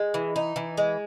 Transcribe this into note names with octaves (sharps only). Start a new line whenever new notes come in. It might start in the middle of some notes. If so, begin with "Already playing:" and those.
Already playing: G#3
E3
D#4
E3
G#3